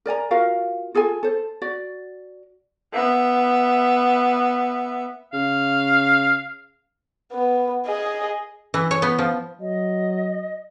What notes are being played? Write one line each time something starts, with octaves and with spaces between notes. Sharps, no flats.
A#4 D5 G#5 A#5
F4 F#4 A#4 F5
F4 G#4 A4 G#5
A4 C5
F#4 D5
B3 E5
C#3 F5
B3
G#4 D#5
E3
C#5
B3
F3
F#3 D#5